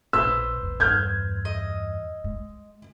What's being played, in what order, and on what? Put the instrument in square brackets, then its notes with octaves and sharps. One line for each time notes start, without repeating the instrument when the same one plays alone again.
[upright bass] A#1 B3 [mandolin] B4 C5 [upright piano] E6
[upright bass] A#1 E2
[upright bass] E2 G2 [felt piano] F6 G6 G#6
[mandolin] D#5
[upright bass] G#3